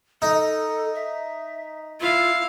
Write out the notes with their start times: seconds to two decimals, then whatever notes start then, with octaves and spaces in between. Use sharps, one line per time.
0.22 D#4 A4
0.95 E5
2.01 E4 F4 F5